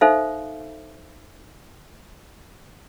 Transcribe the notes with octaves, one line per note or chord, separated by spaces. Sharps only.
D#4 A4 C5 E5 F5